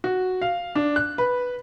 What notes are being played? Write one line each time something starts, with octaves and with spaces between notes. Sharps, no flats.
F#4
F5
D4
F#6
B4